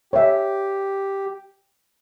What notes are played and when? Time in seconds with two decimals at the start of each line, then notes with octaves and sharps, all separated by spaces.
0.13 G4 C#5 E5